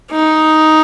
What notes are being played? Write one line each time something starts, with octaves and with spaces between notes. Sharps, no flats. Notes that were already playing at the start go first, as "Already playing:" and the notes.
D#4